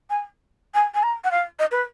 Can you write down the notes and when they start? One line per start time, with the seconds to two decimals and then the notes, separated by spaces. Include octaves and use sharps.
0.09 G#5
0.74 G#5
0.94 G#5
1.03 A#5
1.24 F#5
1.31 F5
1.59 D#5
1.71 B4